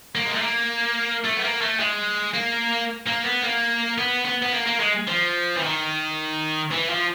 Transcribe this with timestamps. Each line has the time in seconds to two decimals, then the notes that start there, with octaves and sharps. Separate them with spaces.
0.15 A#3
0.26 G#3
0.34 A3
0.42 A#3
1.25 A3
1.37 B3
1.43 A#3
1.61 A3
1.80 G#3
2.34 A#3
3.07 A#3
3.25 B3
3.44 A#3
3.98 B3
4.25 B3
4.42 B3
4.52 A#3
4.66 A#3
4.80 G#3
5.07 F3
5.56 E3
5.63 D#3
6.71 E3
6.89 F3